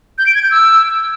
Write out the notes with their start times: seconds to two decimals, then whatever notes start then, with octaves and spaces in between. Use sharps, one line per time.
0.18 G6
0.27 D7
0.35 G#6
0.43 G6
0.51 E6